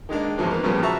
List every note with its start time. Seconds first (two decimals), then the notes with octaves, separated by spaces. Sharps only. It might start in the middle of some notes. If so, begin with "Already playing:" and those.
0.09 D#3 G#3 A#3 D4
0.37 E2 G#2 C#3 F3 F#3 A#3
0.51 A#3 B3
0.63 A#2 C#3 F3 G3 A#3 B3
0.82 F#4 E5 A5 A#5 C#6